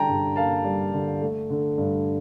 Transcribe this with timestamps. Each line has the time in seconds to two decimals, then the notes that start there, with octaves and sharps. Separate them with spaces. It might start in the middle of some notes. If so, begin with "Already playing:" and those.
Already playing: D3 G3 G5 A5 A#5
0.09 G2
0.36 A#3 F5 A5
0.65 G3
0.93 D3
1.22 A3
1.50 D3
1.78 G2